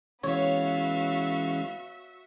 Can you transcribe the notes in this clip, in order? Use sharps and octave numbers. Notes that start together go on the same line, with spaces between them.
E3 G#3 B3 C#4 F#4 C#5 E5 F5